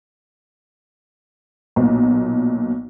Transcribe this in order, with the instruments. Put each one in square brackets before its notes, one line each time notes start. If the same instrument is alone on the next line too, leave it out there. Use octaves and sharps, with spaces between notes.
[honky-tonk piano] B1 A#2